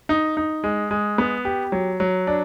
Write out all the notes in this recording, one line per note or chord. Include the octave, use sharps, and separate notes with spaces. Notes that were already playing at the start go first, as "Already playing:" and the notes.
D#4
D#4
G#3
G#3
B3
G4
F#3
F#3
D4